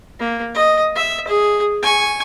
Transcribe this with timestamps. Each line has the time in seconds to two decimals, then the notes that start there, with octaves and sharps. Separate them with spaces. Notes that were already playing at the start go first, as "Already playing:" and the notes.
0.20 A#3
0.55 D#5
0.95 E5
1.28 G#4
1.82 G#5 C#6